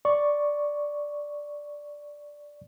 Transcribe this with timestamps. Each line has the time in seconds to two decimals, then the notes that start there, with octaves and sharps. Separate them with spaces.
0.05 D5 C#6